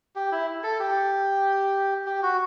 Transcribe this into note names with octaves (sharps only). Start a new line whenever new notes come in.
G4
E4
A4
G4
G4
F#4